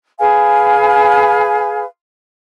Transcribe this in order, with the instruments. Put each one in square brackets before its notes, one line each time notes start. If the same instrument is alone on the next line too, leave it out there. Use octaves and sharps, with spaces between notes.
[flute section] G#4 B4 F5 G#5